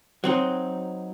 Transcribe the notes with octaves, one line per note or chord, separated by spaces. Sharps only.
F#3 C4 D#4